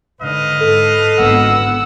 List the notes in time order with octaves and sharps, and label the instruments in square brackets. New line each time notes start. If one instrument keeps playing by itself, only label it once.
[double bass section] G#2 D3 [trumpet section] B4 D#5 F5
[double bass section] G#2 [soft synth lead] A4
[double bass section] G#1 D3 B3 [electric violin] F#5 E6